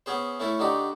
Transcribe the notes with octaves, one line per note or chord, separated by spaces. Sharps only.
B3 C#4 G#4 C5
A3 C#4 E4 A4
D3 D4 D#4 F#4 G4